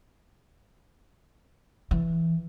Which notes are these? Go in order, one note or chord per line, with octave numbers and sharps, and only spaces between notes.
E3